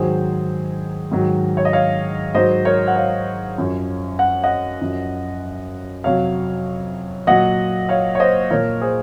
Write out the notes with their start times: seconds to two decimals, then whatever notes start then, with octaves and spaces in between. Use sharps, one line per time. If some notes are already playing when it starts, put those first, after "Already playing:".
Already playing: G#2 D#3 F#3 G#4 C5
1.11 G#2 D#3 F#3
1.57 C#5
1.65 D#5
1.73 C#5 F5
2.35 G#2 F#3 C5 D#5
2.65 A#4 C#5
2.87 F#5
2.96 C#5 F5
3.58 F#2 F3
4.19 F#5
4.44 D#5 F#5
4.81 F#2 F3
6.04 F2 C3 F#3 C#5 F5
7.27 A#2 F#3 D#5 F#5
7.89 C#5 F5
8.15 C#5
8.20 C5 D#5
8.50 A#2 F3 A#4 C#5
8.81 G#4 C5